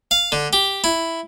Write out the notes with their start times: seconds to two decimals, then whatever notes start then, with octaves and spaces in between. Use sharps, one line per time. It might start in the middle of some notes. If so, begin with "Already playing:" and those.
0.11 F5
0.32 D3
0.53 G4
0.84 E4